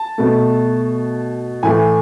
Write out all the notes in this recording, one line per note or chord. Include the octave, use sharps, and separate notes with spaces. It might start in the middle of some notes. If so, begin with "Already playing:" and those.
Already playing: A5
B2 A3
A2 E3 A3 G#5